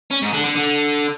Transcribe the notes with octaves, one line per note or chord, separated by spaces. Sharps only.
C#4
G#2
D3
D3
D3